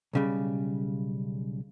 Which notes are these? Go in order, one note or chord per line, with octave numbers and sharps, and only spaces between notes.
B1 C#3 G3